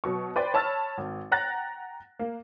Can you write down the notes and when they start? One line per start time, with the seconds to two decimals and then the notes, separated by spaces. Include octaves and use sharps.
0.04 B2 F#3 C#6
0.36 B4 C5 D5 G5 B5 C6
0.54 C#5 A5 B5 E6 F6 A6
0.98 G#1
1.31 F#5 G5 A#5 F#6 A6 A#6
2.19 A#3